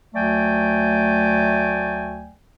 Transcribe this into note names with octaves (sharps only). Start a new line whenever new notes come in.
D2 F#3 A3 D5 G5 G#5